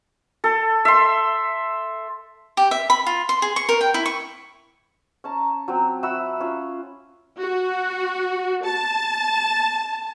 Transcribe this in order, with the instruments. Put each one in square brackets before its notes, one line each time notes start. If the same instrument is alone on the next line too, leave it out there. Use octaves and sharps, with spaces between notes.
[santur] A4
E5 C6
[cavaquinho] G4
E5
B5
F4
C6
G#4
C#6
A#4
G5
E4
C#6
[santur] C#4 A5 A#5
F#3 C4
F#4 E5 B5 E6
C#4 F4
[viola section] F#4
A5